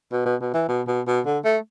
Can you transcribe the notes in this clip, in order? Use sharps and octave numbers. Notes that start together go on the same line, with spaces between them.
B2
B2
B2
E3
B2
B2
B2
D3
A3